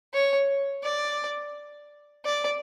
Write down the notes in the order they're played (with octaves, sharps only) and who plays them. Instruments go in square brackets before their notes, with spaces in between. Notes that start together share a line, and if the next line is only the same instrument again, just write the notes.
[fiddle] C#5
D5
D5